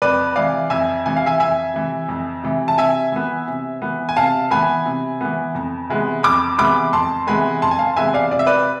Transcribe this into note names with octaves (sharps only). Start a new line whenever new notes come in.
F2 B4 D5
C3 E3 D5 F5
F2 E5 G#5
C3 E3 G#5
F5
E5 G#5
F2 E5 G#5
C3 E3
F2
C3 E3
A5
C3 E5 G#5
E3 B3
C3
E3 B3
G#5
C3 F5 A5
E3 B3 G#5 B5
C3
E3 B3
F2
C3 E3 G#3 B3
F2 B5 D6
C3 E3 G#3 B3 B5 D6
F2 A5 C6
C3 E3 G#3 B3 G#5 B5
F2 A5 C6
G#5
F5 A5
C3 E3 G#3 B3 E5 G#5
D5 F5
C3 D5
E5
B4 D5